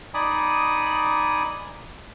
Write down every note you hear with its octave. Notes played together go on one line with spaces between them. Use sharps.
D#4 D5 G#5 B5 D#6